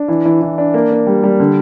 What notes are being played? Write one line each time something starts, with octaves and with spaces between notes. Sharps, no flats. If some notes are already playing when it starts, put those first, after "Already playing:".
Already playing: D4
E3
E3
E3
D4
A#3
A#3
G3
G3
D3